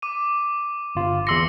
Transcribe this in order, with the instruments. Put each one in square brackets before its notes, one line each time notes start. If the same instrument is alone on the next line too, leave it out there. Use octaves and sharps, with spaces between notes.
[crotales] D6 D#7
[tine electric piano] G1 F4
[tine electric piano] E2 C6 C#7 [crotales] D6 E6 A#6